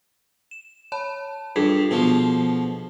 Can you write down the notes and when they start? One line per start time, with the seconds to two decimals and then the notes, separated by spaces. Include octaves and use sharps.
0.51 E7
0.92 C#5 A5 B5
1.56 G2 F4 G#4 A4
1.91 B2 F3